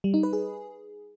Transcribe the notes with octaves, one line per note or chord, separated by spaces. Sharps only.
G3
D#4
B4
G#4